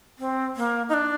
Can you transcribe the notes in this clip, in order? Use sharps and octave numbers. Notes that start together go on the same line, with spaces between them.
C4
A#3
D#4
D4